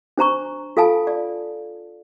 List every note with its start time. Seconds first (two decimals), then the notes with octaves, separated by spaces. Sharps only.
0.18 D4 C5 A#5 C#6
0.77 F4 A4 F5 G#5 A5
1.07 D5